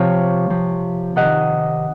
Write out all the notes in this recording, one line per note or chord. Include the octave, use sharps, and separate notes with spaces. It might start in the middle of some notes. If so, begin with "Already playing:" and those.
Already playing: C3 F3 C#5 F5
C3 F3
C3 D#3 D#5 F#5